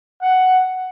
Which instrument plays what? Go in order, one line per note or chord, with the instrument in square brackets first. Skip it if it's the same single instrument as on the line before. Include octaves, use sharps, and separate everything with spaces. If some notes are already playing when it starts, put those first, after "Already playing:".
[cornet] F#5